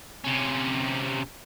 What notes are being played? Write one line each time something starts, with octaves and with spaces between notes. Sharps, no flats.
C3 C#4